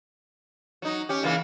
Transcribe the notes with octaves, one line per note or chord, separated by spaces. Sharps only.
F#3 D#4
C#4 G4
C#3 E3 A#3